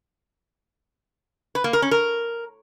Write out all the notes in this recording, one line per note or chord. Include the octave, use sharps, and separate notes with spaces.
B4
A#3
A#4
C#4
A#4